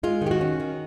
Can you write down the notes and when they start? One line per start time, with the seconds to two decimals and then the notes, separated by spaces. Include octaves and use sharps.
0.03 G#3 F4
0.22 D#3 G4
0.31 F#4
0.41 C#4
0.60 D#3